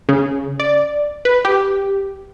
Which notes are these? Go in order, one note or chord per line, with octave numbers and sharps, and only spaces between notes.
C#3
D5
B4
G4